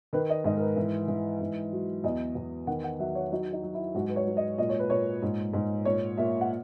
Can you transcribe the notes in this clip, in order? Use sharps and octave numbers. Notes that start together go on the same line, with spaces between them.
D#3 B4
D#5
G#2 D#5
A#4
B4
E3
E3
G#2
F#3
E2 D#5
E2
D#3 F#5
F#5
F#3 E5
C#5
F#3 D#4
D#4
F#3
E4
G#2 F#4
B4
C#5
F#3
D#5
A#2 D#5
C#5
B4
A#2 C#5
G#2
G#2
A#2 C#5
A#2 E5
F#5